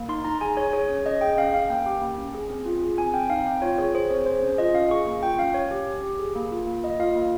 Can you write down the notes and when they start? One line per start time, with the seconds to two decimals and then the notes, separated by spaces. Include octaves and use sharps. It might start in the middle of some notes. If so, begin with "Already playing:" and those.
Already playing: A#3
0.08 D#4 C6
0.24 D#4 A#5
0.41 G#4 G#5
0.57 G#4 C#5
0.73 G#4 C#5
0.89 C#4 C#5
1.06 C#4 D#5
1.21 G#4 G5
1.37 C#4 F5
1.53 C#4 F5
1.70 A#3 G5
1.86 G4
2.02 A#3
2.18 C#4
2.34 G#4
2.50 C4
2.65 F4
2.82 G#4
2.98 C4 G#5
3.14 C4 G5
3.30 D#4 F5
3.47 C4 G5
3.62 F4 C#5
3.78 G#4 C#5
3.95 G#4 C5
4.10 C4 C#5
4.26 G#4 C5
4.43 C#4
4.58 F4 D#5
4.74 C#4 F5
4.90 G#4 C#6
5.07 A#3 C#6
5.23 F4 G5
5.38 C#4 F5
5.54 C#4 C#5
5.71 G4
5.87 G4
6.03 G4
6.19 G#4
6.35 A#3
6.51 F4
6.67 A#3
6.83 A#3 D#5
7.00 F4 F5
7.15 A#3